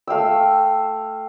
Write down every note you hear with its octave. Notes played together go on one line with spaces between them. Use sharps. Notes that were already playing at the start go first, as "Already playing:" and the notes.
A3 F5 G5 E6